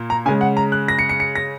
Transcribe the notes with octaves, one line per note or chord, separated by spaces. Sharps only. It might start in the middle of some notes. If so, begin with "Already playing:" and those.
Already playing: A#2 A#3
A#5
C#3 G#3 G#5
F#5
A#5
F#6
A#6
C#7
C#7
C#7
A#6